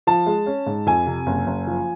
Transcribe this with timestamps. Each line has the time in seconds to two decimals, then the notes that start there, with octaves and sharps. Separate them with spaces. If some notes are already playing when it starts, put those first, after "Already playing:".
0.07 F3 A5
0.26 G#3
0.46 C#4
0.66 G#2
0.86 F2 G#5
1.06 C3
1.26 F#1
1.46 F#1
1.67 F3